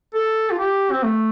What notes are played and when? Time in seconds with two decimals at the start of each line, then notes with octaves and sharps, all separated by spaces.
0.14 A4
0.51 F4
0.59 G4
0.91 C4
1.03 A3